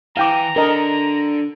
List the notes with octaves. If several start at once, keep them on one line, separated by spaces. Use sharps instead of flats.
E3 F5 G5 A#5 D6
D3 A#4 D#5 A5